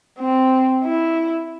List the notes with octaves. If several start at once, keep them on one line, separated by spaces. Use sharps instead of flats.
C4
E4